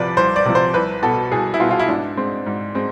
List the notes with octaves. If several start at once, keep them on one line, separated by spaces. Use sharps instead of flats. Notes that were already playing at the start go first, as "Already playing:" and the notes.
Already playing: C2 C3 F3 B4 D5
C2 C5
D5
C3 F3
C5
C2 B4
B2 B3 A4
C2 G#4
E4
B2 B3 F4
F4
E4
G#2 D4
G#3 C4
G#2
G#3 C4